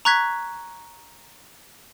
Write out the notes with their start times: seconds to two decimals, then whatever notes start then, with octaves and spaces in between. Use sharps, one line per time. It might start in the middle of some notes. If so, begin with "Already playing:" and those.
0.05 A#5 C#6 F#6 G#6 B6